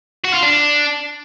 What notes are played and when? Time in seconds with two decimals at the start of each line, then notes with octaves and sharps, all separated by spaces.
0.25 F#4
0.34 F4
0.43 D4